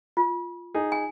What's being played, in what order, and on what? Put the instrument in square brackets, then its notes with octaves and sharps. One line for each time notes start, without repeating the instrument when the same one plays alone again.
[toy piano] F4
[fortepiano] D#4 G#4
[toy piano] G#5